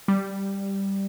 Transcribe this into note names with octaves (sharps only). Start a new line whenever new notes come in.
G3